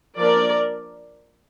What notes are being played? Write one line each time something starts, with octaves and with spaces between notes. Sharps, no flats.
F3 A#3 D4 A#4 D5